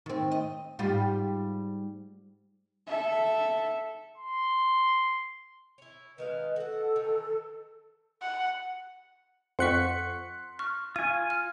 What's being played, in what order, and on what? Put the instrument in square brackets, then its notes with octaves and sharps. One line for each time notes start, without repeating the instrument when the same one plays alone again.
[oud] D#3 C4
D#5
G#2 G3 F4
[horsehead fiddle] A4 E5
[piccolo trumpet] C6
[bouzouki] C#4 E4
[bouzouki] D#3 G#3 F5 [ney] B4
[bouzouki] F#4 F#5 [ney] A4
[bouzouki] D#3 E3
[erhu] F#5
[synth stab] F2 C#7 [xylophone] F#5 C#6 [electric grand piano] C6 F#6 B6
[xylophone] C#6 F6
[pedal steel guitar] F4 G#5 [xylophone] D#7
[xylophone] F6